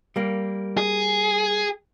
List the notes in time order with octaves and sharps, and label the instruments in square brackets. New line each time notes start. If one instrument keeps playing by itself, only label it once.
[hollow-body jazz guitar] G3 A#3
[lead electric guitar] G#4